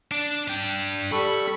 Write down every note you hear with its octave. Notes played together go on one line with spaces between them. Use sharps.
D4
D4 G5
G3 A4 B5 C#6